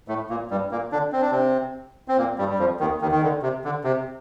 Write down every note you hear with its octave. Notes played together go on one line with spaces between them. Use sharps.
A2 A3
A#2 A#3
G2 G3
A#2 A#3
D3 D4
C4
D4
C3 C4
C4
A#2 A#3
G2 G3
G3
F2 F3
D#2 D#3
D#2 D#3
D#3
D3
C3
D3
C3